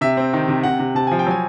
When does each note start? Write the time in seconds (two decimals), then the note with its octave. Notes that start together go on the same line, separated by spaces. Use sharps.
0.01 C3 E5
0.17 C4
0.33 D#3
0.48 C3
0.63 C3 F#5
0.79 C3
0.95 C3 A5
1.07 F3 G#5
1.19 G5
1.26 F#3 G#5